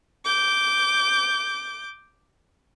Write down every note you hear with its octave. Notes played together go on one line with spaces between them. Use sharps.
D6 G6